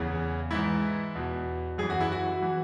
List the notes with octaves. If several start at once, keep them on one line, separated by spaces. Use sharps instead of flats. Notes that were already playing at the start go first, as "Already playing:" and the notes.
Already playing: E2 C#3 E3
G#2 E3 E4
E2 B2
F#2 E3 G#4
F#4
E4
F#4
E3